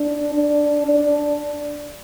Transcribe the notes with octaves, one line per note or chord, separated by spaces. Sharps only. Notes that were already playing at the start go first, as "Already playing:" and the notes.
Already playing: D4
D4
D4